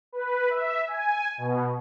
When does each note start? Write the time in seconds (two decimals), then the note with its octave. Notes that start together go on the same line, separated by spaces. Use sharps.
0.12 B4
0.50 E5
0.87 G#5
1.38 B2